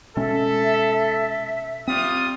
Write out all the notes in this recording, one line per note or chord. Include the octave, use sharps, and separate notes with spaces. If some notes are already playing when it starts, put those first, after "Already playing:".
B2 G#3 C#4 A4 E5
G3 C4 F4 D#6